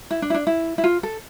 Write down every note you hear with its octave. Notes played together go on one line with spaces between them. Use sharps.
E4
D4
E4
D4
E4
E4
F4
A4